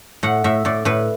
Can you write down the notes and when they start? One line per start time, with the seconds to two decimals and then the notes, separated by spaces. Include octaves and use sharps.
0.23 A2 F#5
0.44 A2 E5
0.65 A2 D5
0.85 A2 B4